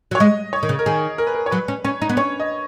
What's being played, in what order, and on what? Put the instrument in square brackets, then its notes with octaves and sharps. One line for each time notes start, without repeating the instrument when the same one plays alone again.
[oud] F#3
[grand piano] C#5
[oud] G#3 [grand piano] D#5
[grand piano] C#5
[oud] D#3
C#3
[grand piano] A#4
[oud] D#3 [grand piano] G#4
[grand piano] A#4
B4
A#4
C#5
[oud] F#3 [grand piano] B4
[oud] C#4
[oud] C#4 [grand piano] C#5
[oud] D#4
B3
[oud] C#4 [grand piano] C#5
[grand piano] D#5